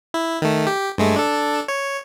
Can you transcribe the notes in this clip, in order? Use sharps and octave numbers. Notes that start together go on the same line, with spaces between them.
E4
D#3 A3
G4
G2 G#3 A3
D4 A4
C#5